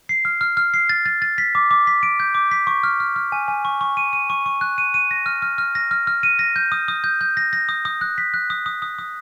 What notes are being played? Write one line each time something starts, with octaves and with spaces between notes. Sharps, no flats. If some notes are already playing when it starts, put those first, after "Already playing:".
C7
F6
F6
F6
C7
A6
A6
A6
B6
D6
D6
B6
D7
G6
D6
B6
C#6
F6
F6
F6
G#5
G#5
C#6
C#6
D#7
D#7
C#6
C#6
F#6
D#7
D#7
A#6
F6
F6
F6
A#6
F6
F6
D#7
A#6
G6
D#6
D#6
G6
G6
A#6
A#6
D#6
D#6
F#6
B6
F#6
D#6
D#6
D#6
D#6